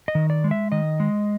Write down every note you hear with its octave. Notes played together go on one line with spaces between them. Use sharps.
D#5
D#3
D5
G#3
E5
D#3 D#5
G#3